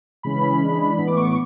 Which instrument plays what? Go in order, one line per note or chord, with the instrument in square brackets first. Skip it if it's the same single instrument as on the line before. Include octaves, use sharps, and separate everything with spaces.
[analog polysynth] C#3 E3 G#3 C#4 B5
E3 G#3 D4
A2 E3 B3 B5
D6
C#6
D6